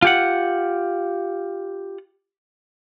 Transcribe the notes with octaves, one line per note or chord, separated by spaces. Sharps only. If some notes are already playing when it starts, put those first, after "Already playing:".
F4 G4 F#5